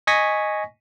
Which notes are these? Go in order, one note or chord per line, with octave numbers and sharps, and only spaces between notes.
D#5 G#5 C#6 A#6 B6